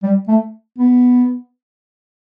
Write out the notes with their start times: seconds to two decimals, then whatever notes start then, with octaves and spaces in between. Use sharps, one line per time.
0.03 G3
0.28 A3
0.78 B3